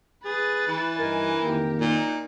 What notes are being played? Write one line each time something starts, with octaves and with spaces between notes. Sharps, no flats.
G#4 B4 A6
E3
G2 D#4 A#4 G#5
F2 D#3 A#3 G4
A#2 D#4